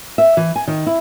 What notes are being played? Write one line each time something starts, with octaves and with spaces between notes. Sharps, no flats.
E5
E3
G#5
D#3
E4